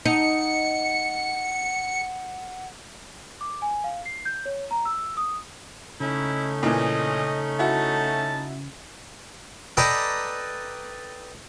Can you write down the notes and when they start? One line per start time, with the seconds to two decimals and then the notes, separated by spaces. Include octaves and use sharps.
0.05 D#4 F#5 C#7
3.41 D6
3.62 G#5
3.84 F5
4.06 C7
4.25 G6
4.45 C#5
4.71 A#5
4.85 E6
5.17 D#6
6.00 C#3 A3 C#4 D#4 E4
6.63 A#2 E3 D#5
7.59 E4 F#4 A5
9.77 A4 B4 D5 D#5 G5 A#5